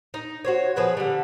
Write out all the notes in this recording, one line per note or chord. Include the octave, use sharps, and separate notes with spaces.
D#4
F#4 C5 C#5
F3 G#4 B4 C#5
D3 G3